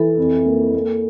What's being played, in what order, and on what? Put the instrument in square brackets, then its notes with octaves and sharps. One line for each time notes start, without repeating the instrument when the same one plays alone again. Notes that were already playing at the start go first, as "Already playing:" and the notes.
Already playing: [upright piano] E3 [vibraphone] A4
[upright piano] F2
A#3
A#3